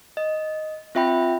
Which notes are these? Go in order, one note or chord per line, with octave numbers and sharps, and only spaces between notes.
D#5
C4 F4 E5 G5 B5